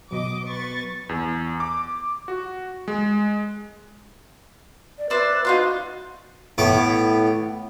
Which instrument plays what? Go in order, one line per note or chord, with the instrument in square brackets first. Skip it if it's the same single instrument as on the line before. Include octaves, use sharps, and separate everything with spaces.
[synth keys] B2 F#3 [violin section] D#5 D6
[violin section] B4 C#6 A6
[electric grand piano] E2
D6
F#4
G#3
[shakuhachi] D5
[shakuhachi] B4 [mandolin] C5 D5 E5
[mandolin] D#4 F4 C6 [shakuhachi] F#4
[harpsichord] A2 B3 C#5 D6